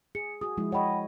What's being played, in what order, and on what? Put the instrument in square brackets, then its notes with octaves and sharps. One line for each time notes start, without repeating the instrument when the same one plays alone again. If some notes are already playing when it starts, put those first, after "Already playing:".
[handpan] G#4 [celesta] C#7
[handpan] F#4 G#4 [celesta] D#6
[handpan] F3 G#3 E4
[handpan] C#5 D#5 [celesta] F#5 G5 B5